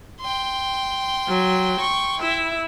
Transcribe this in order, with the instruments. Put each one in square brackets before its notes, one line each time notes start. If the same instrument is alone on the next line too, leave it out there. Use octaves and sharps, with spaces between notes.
[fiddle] G5 C6
[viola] F#3
C#6
E4 E5